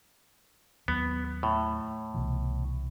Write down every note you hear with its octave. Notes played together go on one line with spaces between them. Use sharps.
D#2 F#3 B3
A2
C2 B2 E3